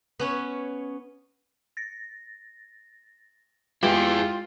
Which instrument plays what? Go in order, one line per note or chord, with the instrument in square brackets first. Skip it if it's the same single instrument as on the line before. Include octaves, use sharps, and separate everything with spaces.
[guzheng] B3 C#4 C#5
[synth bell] A6 A#6
[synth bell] G#3 B4 F#7 [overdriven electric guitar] E4 G#4 [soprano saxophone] F4 [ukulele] G4